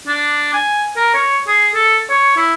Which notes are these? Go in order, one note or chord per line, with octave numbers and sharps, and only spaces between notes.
D4
G#5
A#4
C#5
G#4
A4
C#5
E4